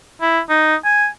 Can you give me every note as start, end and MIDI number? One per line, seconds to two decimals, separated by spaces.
0.22 0.40 64
0.49 0.75 63
0.85 1.07 80